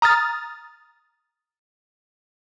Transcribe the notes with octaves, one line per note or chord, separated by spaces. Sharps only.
A#5 D#6 F6 A6